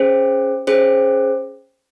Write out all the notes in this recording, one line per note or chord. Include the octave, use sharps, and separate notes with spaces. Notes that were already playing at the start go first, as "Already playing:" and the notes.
Already playing: C#4 G#4 C5
C#4 G#4 C5